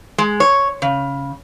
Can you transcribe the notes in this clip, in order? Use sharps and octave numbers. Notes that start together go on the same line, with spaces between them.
G#3
C#5
C#3